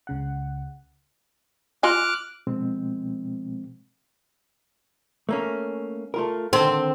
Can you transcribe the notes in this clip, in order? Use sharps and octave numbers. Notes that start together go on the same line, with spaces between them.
C#2 C#3 F#5
F4 D#5 G#5 D6 F6 F#6
B2 F3 G#3 C4
A3 A#3 C#4
A3 F4 A#4
D3 D#3 C4 A4